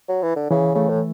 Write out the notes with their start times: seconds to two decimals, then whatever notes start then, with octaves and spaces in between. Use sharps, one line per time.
0.09 F#3
0.23 E3
0.36 D3
0.51 C#3 E3
0.75 C#3 A3
0.89 A2